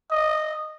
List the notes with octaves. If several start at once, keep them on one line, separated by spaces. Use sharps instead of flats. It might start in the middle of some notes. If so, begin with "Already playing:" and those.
D#5